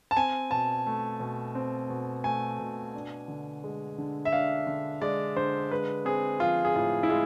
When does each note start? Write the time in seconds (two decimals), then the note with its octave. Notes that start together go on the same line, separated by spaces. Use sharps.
0.11 A5
0.17 C4 G#5
0.51 B2 A5
0.87 A3
1.20 B2
1.55 C4
1.90 B2
2.24 A3 G#5
2.60 B2
2.95 D4
3.28 D3
3.64 G#3
3.98 D3
4.25 E5
4.32 D4 F5
4.67 D3
5.02 G#3 D5
5.36 D3 C5
5.71 G#3 B4
6.05 C4 G#4
6.40 F3 F4
6.65 G#4
6.76 A2 F4
7.03 E4
7.10 G#3 F4